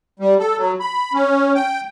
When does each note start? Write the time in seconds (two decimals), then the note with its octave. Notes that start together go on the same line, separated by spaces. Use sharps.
0.20 G3
0.39 A4
0.58 F#3
0.80 B5
1.13 C#4
1.55 G5